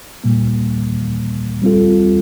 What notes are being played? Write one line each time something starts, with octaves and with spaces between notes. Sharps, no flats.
A#2 G3 A#3
G3 C4 F4 A4